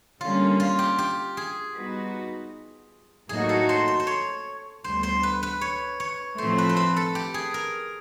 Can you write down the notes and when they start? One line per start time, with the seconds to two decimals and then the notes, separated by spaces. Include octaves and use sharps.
0.21 D3 G3 A#3 C#4 F4
0.60 F4
0.79 G4
0.98 G4
1.37 G#4
1.76 G3 B3 D#4 F#4 B4
3.29 A2 F#3 A#3 D#4 F#4 G#4
3.49 A4
3.69 C5
3.88 C5
4.00 C5
4.07 C#5
4.84 D2 D3 G3 B3 C5
5.03 C5
5.23 B4
5.43 B4
5.61 C#5
6.00 C#5
6.38 A2 F3 A3 C4 C5
6.58 B4
6.69 C5
6.77 B4
6.96 A4
7.15 G4
7.34 G#4
7.54 A#4